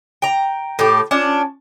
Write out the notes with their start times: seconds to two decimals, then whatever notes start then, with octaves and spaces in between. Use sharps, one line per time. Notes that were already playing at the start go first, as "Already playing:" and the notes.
0.22 G5 A#5
0.79 A2 G4
1.11 C#4 D4 F4 A5